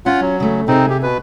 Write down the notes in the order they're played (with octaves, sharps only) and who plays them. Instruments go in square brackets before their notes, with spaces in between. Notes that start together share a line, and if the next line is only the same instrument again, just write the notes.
[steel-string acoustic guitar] C#4 [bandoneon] F4 F#5
[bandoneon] F#3
[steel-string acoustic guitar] C#3 A3
[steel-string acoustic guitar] C3 G#4 [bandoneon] C4 D#4
[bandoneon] G4
B2 B4